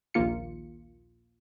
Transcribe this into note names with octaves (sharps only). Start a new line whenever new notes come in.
A#1 D#2 A#3 F4 C#7